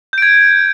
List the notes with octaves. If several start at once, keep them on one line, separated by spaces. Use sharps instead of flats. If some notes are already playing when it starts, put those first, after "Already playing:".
G6 G#6 D7